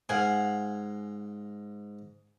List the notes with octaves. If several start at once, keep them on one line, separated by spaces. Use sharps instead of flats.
G#2 F5 F#5 G#5